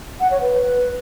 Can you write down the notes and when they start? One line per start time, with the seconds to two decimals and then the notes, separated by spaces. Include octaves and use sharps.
0.20 F#5
0.30 C#5
0.41 B4